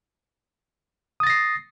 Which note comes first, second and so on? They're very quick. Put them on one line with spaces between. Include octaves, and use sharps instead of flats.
D#6 A6 A#6 C7